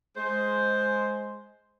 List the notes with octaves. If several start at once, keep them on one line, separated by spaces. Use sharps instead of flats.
G#3 C5